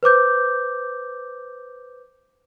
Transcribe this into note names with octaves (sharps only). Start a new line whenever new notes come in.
B4 C5 D6 G6